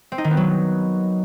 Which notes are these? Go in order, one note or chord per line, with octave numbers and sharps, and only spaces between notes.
C4
D#4
D#3
B3
F#3